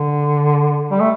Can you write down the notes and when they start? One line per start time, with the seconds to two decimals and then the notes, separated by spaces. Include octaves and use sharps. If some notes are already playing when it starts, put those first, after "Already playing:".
Already playing: D3
0.91 G3
1.00 A3